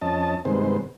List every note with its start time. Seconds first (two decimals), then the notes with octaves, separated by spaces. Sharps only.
0.02 F2 C#4 D#5 A5
0.45 G2 C3 D#3 G#3 B3 C5